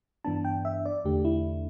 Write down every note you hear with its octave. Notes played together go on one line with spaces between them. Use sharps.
G2 E3 B3 D4 A5
G5
E5
D5
E2 D3 A3 D4 G4
E4